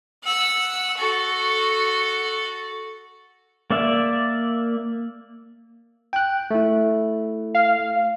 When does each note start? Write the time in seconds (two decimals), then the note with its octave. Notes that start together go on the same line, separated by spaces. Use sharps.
0.24 F#5 E6
0.97 F#4 A4
3.70 A#3 D5 E5
6.13 G5 F#6
6.51 A3 E4
7.55 F5